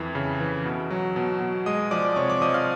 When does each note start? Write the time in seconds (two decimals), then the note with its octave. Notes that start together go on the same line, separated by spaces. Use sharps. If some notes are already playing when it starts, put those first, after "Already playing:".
Already playing: F2 E3 E5
0.15 C#3
0.40 E3
0.66 B2
0.90 F#3
1.16 B2
1.40 B2
1.66 G#3 D#5 D#6
1.91 F3 D5 D6
2.16 C3 C#5 C#6
2.29 D5 D6
2.42 F3 D#5 D#6
2.54 F5 F6